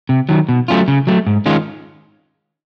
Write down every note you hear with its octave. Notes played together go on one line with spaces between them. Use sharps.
C3
D#3 F#3
B2
F#3 A3 C#4 F4
C#3
F#3 A3
G#2
D#3 G#3 C#4 F4